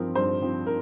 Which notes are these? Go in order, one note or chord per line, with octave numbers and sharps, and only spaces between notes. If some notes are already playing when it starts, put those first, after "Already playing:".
Already playing: G2 F3 C4 A#4
G2 C5
F3 C4
A#4